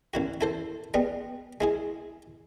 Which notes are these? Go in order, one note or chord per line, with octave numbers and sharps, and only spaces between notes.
A1 E4 F#4
E4 A4 C5
G3 G#3 B3
G#3 E4 G#4